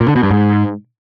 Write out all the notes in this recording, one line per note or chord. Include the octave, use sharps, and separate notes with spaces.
A#2
D3
B2
G2
G#2